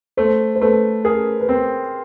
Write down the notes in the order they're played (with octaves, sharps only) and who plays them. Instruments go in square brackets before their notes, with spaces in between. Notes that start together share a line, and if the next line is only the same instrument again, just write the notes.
[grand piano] A3 [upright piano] C5
[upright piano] C5
[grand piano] A3 [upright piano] B4
[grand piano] G#4 [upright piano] A#4
[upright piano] B4
[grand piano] C4 [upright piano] A#4